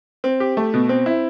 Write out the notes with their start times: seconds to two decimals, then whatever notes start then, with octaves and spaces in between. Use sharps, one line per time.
0.24 C4
0.40 G4
0.57 A3
0.74 B2
0.89 C4
1.06 E4